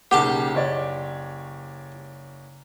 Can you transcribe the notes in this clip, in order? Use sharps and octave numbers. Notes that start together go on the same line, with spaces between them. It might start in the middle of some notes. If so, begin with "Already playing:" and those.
B1 C#3 A#3 G4 F#5 G5 A5 D6
F#1 C#5 D5